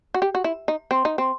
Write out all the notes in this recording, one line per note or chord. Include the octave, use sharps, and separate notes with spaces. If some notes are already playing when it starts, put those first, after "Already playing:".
F#4
G4
F#4
E4
D#4
C4
D#4
C4